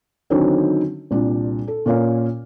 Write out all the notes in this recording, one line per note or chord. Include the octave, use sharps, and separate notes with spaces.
D3 D#3 F#3 C4 C#4 D#4
C2 A#2 D4
A4
A#2 A#3 C#4 F5